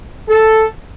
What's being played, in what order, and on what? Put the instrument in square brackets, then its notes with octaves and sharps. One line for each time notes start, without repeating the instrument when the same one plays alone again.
[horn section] A4